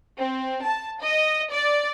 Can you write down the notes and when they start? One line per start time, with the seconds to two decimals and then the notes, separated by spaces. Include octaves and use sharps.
0.19 C4
0.66 A5
1.02 D#5
1.51 D5